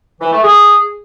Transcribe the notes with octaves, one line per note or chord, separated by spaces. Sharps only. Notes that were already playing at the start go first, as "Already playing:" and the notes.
E3
A3
G#4